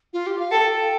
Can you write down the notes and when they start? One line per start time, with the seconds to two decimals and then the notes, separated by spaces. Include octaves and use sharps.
0.13 F4
0.27 G4
0.39 F5
0.51 A4 G5